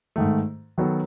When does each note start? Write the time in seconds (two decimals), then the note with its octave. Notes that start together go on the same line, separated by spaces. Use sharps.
0.16 G#2 D#3 A3
0.78 D#3 F#3 B3 F#4 A4